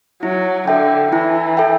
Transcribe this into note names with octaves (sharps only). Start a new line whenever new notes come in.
F#3 E4
D3 A4 E5 G5
E3 E4
A4 E5 G5